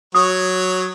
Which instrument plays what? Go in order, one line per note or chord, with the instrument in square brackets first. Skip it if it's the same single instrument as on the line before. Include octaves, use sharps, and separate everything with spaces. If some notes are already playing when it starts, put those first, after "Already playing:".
[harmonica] F#3 C#5 [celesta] D#6